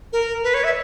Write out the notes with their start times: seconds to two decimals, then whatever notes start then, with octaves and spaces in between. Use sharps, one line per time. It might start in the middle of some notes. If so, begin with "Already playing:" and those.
0.13 A#4
0.43 B4
0.54 C#5
0.64 E5